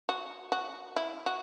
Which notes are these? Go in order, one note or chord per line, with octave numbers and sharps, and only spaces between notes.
F#4
F#4
E4
F#4